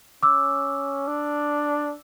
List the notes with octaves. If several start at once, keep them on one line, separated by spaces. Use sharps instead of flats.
C#4 D6 E6
D4